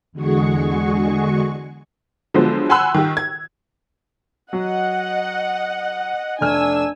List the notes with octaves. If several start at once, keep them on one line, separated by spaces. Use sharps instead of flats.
E2 D3 G#3 F#4 G#4 C#6
D3 F3 F#3 G#3 B3 C5
F#5 G#5 B5 C6 E6 F#6
D#3 G4
G#6
F#3 D#5 F#5
F1 A3 D4 G#5 E6 F6